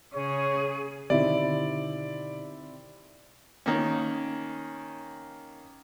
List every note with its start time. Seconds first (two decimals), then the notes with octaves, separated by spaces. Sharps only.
0.14 C#3 G#4 C#5
1.10 B2 D3 D#3 C4 D#4 E4 G4 D5
3.66 D#3 A#3 C#4